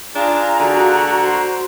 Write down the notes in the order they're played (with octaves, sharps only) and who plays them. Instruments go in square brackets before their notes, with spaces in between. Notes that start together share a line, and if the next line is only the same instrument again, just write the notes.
[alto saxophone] D4 [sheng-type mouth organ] F4 G#4 [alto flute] A#5
[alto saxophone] D3 [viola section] F#4
[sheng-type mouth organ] C5